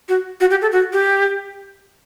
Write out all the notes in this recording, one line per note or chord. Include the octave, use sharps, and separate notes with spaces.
F#4
F#4
G4
A4
F#4
G4